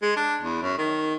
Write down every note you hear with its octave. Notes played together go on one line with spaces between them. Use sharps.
G#3
D4
E2
F#2
D#3